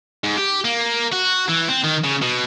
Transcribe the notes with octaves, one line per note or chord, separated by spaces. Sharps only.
G#2
G4
A#3
F#4
E3
C4
D#3
C#3
B2